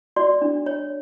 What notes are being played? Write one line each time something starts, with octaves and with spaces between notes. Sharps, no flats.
F#4 D5
D4
C#5